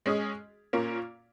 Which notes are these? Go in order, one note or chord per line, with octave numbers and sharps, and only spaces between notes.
G#3 C#4 G#4 D#5
A#2 A#3 C#4